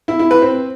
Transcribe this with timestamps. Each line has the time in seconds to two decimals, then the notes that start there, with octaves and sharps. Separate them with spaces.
0.08 E4
0.19 E4
0.31 B4
0.42 C4